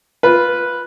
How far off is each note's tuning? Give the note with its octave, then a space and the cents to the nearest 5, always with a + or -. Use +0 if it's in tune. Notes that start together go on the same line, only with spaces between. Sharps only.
F4 +0 B4 -5